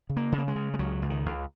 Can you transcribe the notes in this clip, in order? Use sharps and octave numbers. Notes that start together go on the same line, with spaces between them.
C#3
A#3
C#3
A#3
G#3
C#3
G#3
C#2 F#3
C#2
D#3
C#2